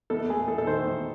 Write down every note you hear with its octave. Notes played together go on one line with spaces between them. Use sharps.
E2 A4
A3 G#4
E2 A4
A4
D#3 C5
E2